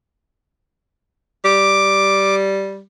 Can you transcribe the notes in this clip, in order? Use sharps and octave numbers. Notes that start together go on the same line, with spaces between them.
G3 D6